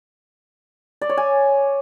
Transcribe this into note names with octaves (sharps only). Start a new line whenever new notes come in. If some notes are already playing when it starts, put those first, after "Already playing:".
D5
C#5
G#5